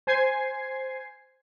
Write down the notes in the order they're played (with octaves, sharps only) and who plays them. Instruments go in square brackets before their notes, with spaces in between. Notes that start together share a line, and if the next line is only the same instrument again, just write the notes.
[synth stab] C5 G#5 G#6 C7